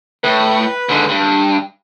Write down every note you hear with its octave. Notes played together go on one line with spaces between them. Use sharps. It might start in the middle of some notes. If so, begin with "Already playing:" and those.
A2 B4
G#2 D3
G2